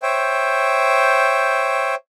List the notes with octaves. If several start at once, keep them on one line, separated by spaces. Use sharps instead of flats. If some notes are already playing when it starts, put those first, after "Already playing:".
C5 C#5 E5 G5